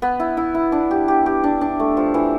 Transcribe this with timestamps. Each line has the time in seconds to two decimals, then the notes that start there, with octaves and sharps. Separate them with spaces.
0.02 B3
0.20 E4
0.37 E4
0.54 E4
0.72 D4
0.91 G4
1.08 G4
1.26 G4
1.44 D4
1.61 D4
1.79 A3
1.97 F3
2.14 E3